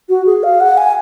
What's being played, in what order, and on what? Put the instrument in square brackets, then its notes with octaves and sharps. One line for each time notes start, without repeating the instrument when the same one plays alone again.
[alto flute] F#4
G#4
F5
F#5
G#5